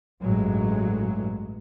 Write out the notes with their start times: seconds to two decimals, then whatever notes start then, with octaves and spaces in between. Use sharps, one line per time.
0.23 A1 G2 F#3 G#3